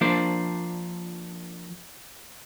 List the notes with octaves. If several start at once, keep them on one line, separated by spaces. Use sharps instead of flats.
F3 A#3 D4 C5 D5